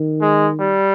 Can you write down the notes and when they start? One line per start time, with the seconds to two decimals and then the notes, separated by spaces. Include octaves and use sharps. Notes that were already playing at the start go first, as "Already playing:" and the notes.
Already playing: D#3
0.21 G#3
0.60 G3